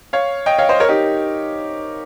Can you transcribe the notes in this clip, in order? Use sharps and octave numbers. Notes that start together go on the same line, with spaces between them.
C#5 F5
D#5 G5
C#5 F5
C5 D#5
A#4 C#5
D#4 G4